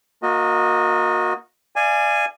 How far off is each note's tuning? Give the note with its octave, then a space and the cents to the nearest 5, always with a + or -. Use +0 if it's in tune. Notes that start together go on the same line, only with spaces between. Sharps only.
A#3 +0 F#4 -30 D#5 +0
D5 +25 F5 -30 G#5 +0